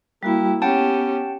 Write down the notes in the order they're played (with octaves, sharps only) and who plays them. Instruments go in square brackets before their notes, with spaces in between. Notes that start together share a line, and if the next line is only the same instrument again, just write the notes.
[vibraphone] G3 F#4 G5 [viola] A#3 E4
[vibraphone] B3 [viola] C#4 G4 [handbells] F#5 G5 A5